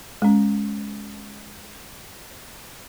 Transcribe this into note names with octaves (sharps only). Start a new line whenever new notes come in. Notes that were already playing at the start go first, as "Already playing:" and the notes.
G#3 C#4